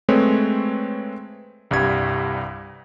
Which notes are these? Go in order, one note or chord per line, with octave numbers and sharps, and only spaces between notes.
G#3 A3 C4 B4 C#5
C2 G2 G3 G#6